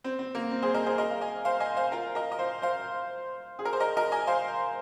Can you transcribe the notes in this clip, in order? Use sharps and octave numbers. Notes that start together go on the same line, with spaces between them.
C4
C4
A#3
C4
G#4 C5
A#4 D#5
G#4 C5
A#4 D#5
F5
D#5 G#5
C5 F5
D#5 G#5
C5 F5
F4 A#4
A#4 D#5
D#5
C5 F5
C5 F5
G#4
A#4
C5
A#4 D#5
A#4 D#5
D#5 G#5
C5 F5